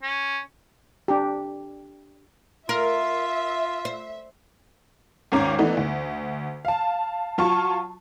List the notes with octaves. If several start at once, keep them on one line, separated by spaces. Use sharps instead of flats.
C#4
D4 G4
F4 A#4 E5
C5
G#1 D#2 C#4 A#5 D6
E3 A3 B3 D4 D#4
D2
F5 A5
F#3 F4 A5 C#6